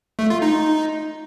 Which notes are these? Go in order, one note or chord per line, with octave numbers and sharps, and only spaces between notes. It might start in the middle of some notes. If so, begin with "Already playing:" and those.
A3
F4
D#4